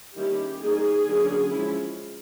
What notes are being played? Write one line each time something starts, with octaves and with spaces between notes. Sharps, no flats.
D#3 G3 A#3 C#4 E4 G4
D#3 G3 A#3 D#4 G#4
D3 F#3 A#3 C#4
F3 G#3 C#4 E4